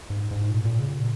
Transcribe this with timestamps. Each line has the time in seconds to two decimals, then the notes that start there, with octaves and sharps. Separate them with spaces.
0.10 G#2
0.31 G#2
0.50 A#2
0.65 A#2
0.80 C#3
0.94 A#2